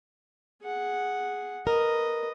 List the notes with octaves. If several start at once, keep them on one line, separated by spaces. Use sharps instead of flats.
G#4 F#5
A#4 B4 D#5